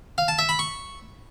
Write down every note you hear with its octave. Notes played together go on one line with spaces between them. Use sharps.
F5
A5
E5
B5
C#6